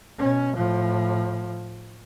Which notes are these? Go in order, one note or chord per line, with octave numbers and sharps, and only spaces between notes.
B2 C#4
A2 F3